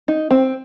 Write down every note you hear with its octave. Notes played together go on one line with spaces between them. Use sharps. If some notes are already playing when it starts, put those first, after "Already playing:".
D#4
C4